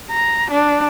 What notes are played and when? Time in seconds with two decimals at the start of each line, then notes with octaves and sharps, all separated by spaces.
0.10 A#5
0.51 D4